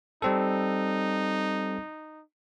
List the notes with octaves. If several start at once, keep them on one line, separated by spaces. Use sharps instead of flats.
G3 C4 D#4 A4